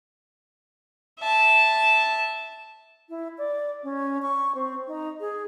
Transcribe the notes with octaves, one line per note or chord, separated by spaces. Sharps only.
E5 A5
E4
D5
C#4
C#6
C4
D#4
G#4